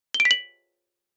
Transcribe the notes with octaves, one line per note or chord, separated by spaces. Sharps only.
G7
D7
B6
F#7